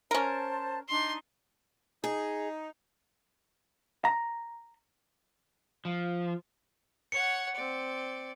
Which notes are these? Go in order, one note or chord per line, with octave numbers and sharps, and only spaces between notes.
C#4 A#4 C5 A5
D4 D#4 C6
D#4 G#4
A#5
F3
C#5 F#5 C#7
C4 D5 C6